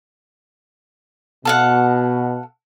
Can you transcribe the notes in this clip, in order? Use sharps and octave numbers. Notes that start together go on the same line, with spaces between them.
B2 A4 F5 F#5